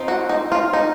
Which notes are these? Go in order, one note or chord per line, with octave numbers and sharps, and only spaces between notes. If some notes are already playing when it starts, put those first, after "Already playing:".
Already playing: F3 C4 D#4
F#4
D#4
F4
D#4